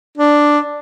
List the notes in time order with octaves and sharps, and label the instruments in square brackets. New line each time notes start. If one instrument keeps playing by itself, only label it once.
[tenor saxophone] D4